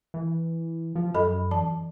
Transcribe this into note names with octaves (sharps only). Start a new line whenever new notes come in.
E3
F3
F#2 A4 D#5 B5
E3 A5